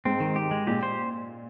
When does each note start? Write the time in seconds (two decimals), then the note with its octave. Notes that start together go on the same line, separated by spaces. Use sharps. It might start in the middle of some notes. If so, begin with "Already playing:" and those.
0.05 G#2 C4
0.20 D#3
0.36 G4
0.51 G#3
0.67 A#2 G4
0.83 C5